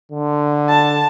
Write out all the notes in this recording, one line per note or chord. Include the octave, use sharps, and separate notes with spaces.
D3
A5